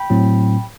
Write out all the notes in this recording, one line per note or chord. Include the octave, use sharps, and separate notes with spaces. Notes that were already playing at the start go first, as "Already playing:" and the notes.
Already playing: G5 B5
A2 F#3 C4